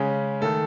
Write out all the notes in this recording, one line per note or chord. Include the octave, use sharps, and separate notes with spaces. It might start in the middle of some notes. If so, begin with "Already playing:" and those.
Already playing: C#3 G#3 C#4
D#3 A3 A4